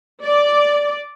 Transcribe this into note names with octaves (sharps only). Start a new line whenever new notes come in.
D5